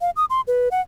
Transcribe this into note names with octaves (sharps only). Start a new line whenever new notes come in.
F5
D#6
C6
B4
F#5